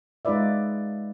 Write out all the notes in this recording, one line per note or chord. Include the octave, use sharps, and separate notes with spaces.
G#3 D#4 F4 B4 D5 E5